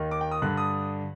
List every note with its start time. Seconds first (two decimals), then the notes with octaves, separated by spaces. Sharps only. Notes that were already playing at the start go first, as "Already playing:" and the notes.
Already playing: D#2 D#3
0.11 D6
0.21 G5
0.31 D#6
0.42 G2 D3 F#6
0.57 D#6